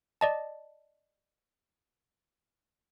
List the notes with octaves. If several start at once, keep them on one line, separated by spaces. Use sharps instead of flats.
D5 D#5 A5